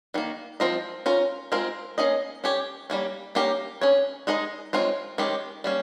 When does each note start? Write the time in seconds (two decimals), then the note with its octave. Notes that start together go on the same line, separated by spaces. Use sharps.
0.14 D#3 G3 A#3
0.60 F3 C4 F4 A#4 D#5
1.06 C#4 F4 A#4
1.52 G#3 C4 F4 A#4
1.98 A#3 C#4 G#4 D#5
2.44 C#4 G4 C#5
2.90 G3 A#3 C#4
3.35 A#3 C#4 G4 A#4
3.81 C#4 G#4 C#5
4.27 G#3 D#4 G#4 D#5
4.73 G#3 C4 F4 A#4 C#5
5.18 D#3 G#3 C#4 G4
5.64 G3 A#3 C#4